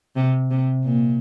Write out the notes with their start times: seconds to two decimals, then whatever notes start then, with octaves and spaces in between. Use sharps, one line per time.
0.16 C3
0.51 C3
0.85 A#2